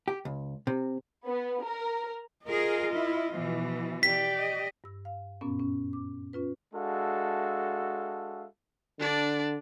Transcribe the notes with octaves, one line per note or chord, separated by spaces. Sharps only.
G4
C#2
C3
B3
A#4
F4 G#4 A#4 D#5
E4
B2 E3 F3
G4 D5 B6
D#5
G2 E6
F5
F#2 A#2 B3 C#4
C#4
D6
C#4 F4 B4
G#3 D4 F#4 A4 E5 F5
D3 D4 D5